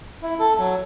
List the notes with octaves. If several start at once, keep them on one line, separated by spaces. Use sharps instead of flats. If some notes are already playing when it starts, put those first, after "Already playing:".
E4
A4
F#3